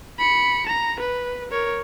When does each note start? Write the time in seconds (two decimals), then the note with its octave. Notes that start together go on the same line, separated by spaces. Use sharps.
0.19 B5 C#7
0.67 A#5
1.00 B4
1.52 A#4 C#5